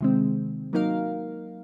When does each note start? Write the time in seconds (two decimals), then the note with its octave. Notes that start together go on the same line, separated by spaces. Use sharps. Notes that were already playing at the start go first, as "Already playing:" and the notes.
0.01 C3 D#3 G#3 C4
0.73 F#3 A#3 D#4 A#4 F5